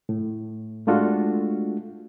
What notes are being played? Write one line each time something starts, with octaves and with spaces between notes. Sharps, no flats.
A2
G#3 A3 D4 F4 F#4 A4